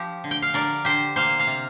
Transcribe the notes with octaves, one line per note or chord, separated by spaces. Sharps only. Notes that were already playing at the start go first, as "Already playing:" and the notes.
Already playing: F3 G4
D3
G5
F5
D3 A#4 D5
D3 G4 C5
A#3 C5 F5
F5 A#5
C3